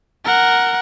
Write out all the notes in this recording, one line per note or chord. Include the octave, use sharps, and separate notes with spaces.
A#4 F#5